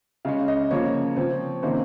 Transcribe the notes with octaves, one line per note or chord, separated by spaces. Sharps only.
C#3 G#3 C#4 F5
D#5
C#3 F3 A#3 C#5
F3 C4
C3 D#3 A#3 C#4 C5